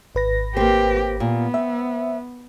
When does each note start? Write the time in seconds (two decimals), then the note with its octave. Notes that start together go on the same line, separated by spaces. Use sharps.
0.15 G#1 B4 A#6
0.57 A#3 C4 G4
1.20 A#2 B3
1.54 C4 E5